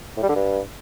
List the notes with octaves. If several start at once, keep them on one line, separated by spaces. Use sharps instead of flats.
A2
G3
D3
G2